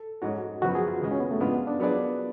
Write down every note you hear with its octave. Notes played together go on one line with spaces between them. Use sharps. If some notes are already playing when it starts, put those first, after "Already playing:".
Already playing: A4
G#2 G#3 C#4 F#4
F#2 C#3 F3 B3 F#4
G#4
F4
C#2 C#3 G#3
C#4
B3
A3
C#3 G#3 B3 D4 F4
D4
F#3 B3 D4 F4 G#4 D5